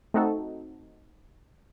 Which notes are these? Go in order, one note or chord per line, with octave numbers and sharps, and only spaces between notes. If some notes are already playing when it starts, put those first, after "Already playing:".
A3 C4 D#4 F#4 A4